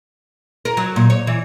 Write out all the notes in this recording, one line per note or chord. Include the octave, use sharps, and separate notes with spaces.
A#4
F#3
A#2
C#5
E3